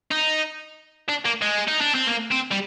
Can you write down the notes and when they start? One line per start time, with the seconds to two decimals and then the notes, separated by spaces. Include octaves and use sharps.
0.11 D#4
1.09 D4
1.25 A#3
1.42 G#3
1.68 D#4
1.81 D4
1.95 C4
2.07 A#3
2.31 C4
2.51 G3